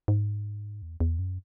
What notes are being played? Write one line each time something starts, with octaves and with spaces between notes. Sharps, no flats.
G#2
E2
E2
F#2